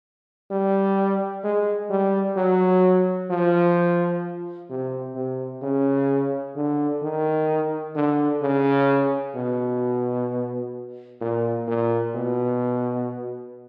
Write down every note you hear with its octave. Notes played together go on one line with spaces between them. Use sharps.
G3
G#3
G3
F#3
F3
C3
C3
C#3
D3
D#3
D3
C#3
B2
A#2
A#2
B2